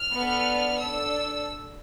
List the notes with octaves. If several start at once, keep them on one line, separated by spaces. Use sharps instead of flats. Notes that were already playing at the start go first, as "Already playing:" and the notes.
Already playing: F6
B3 D4 A4
D4 A4 E6